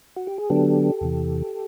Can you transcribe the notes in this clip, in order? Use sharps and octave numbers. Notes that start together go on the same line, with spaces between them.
F#4
G4
G#4
D3 F#3 B3 D4 G4 A4
E2 C3 E3